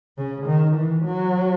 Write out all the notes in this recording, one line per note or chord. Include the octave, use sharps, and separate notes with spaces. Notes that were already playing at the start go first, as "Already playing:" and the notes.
C#3
D#3
E3
F#3